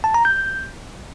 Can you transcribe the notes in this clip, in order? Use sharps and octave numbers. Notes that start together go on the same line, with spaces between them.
A5
A#5
G6